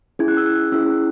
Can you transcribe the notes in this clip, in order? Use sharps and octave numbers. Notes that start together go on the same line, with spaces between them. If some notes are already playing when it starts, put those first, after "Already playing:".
C#4 E4 G#4 G#6
F#6
E6
F#6
C#4 E4 G#4 E6